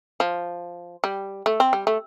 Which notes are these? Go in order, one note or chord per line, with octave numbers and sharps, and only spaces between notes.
F3
G3
A3
C4
G3
A3